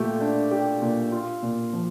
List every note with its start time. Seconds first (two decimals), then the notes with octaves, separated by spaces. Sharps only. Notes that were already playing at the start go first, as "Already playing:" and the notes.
Already playing: A#2 A3 G4
0.21 D4
0.51 G4
0.82 A#2
1.12 F4
1.43 A#2
1.73 F3